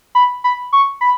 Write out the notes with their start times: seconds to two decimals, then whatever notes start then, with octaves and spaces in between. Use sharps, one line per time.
0.15 B5
0.44 B5
0.73 C#6
1.01 B5